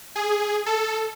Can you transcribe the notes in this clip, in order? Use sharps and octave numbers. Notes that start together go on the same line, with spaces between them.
G#4
A4